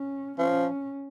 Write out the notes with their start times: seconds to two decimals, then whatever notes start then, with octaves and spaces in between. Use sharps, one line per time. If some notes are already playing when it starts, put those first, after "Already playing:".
Already playing: C#4
0.39 F3 C#4